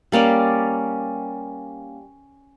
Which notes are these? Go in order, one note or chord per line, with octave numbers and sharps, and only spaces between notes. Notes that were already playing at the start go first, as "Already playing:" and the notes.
G3 A#3 C#4 D5